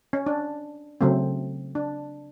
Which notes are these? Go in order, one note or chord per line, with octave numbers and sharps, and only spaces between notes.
C#4
D4
C#3 F#3 A3 C4
D4